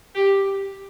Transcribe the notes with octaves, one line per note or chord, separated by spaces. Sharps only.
G4